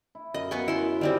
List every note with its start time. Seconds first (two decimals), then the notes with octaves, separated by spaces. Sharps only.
0.15 E4
0.34 F#2 A#4 D#5 F5
0.51 B3 G#5 C#6
0.68 C#4 E4 C6
1.01 D#3 G3 C4